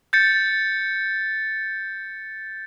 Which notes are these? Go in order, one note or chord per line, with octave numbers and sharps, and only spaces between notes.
G6 A6 C#7